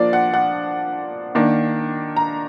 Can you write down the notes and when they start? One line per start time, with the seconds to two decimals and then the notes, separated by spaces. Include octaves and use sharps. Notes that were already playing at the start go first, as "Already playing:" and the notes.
Already playing: F3 A#3 D4 D5
0.13 F#5
0.34 F#5
1.35 D#3 A#3 D4
2.17 A#5